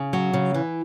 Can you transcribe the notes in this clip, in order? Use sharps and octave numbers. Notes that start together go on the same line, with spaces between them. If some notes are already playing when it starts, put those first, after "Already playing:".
Already playing: C#3
F#3
C#3
E3